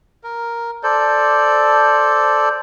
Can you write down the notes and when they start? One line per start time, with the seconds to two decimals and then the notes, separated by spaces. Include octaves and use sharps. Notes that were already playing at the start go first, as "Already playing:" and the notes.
0.24 A#4
0.83 A4 C5 D5